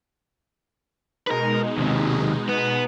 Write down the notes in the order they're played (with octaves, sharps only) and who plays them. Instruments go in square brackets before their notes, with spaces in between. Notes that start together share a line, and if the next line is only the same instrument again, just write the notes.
[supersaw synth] B2 G#3 D#4 [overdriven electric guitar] A#4 B4
[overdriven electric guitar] D#2 C3
B3